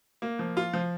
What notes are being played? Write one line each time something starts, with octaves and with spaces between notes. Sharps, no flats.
A#3
F3
F4
F3